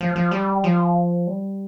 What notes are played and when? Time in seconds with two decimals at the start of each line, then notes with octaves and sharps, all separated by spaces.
0.01 F3
0.16 F3
0.31 G3
0.64 F3
1.27 G3